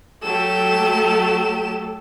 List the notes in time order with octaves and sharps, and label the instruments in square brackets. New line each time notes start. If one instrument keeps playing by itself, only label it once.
[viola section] F#3 A3 A4 [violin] G4 E7